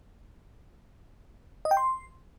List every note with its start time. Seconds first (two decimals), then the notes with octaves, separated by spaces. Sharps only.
1.65 D#5
1.71 G5
1.77 C6